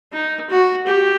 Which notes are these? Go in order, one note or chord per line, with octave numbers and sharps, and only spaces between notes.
D#4
F#4
G4